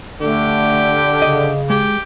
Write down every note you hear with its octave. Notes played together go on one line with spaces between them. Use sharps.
D3 A3 G4
C#3 D#5
G#3 G4